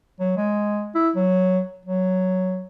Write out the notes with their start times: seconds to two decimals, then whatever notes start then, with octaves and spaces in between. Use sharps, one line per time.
0.20 F#3
0.37 G#3
0.95 E4
1.16 F#3
1.85 F#3